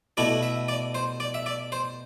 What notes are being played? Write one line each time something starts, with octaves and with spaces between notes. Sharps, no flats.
B2 A3 E4 D5
E5
D5
C5
D5
E5
D5
C5